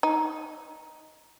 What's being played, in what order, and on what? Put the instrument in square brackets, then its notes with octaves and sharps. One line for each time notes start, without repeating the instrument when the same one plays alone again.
[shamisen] D#4